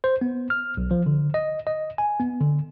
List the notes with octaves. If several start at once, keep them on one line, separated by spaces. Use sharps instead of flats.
C5
B3
F6
B1
F3
D3
D#5
D#5
G#5
B3
D3